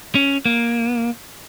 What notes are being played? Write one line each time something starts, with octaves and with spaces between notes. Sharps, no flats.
C#4
A#3